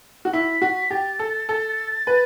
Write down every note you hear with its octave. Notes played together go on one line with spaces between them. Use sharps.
F#4
E4 B6
F#4
G4 A6
A4
A4
B4